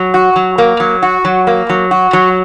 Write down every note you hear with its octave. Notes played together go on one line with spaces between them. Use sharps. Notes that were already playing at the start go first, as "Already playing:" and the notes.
Already playing: F#3
F#4
F#3
A#3
F#3
F#4
F#3
A#3
F#3
F#4
F#3